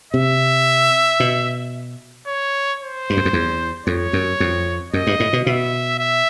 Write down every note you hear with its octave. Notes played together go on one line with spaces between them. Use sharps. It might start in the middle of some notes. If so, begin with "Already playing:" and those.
C3 E5
B2
C#5
C5
G2
F#2
F2
E2
F2 C#5
F#2
F2
F#2 D#5
G2
A2
B2
B2 E5
E5